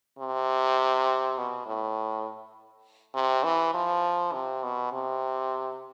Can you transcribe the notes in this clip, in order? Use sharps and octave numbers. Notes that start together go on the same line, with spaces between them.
C3
B2
A2
C3
E3
F3
C3
B2
C3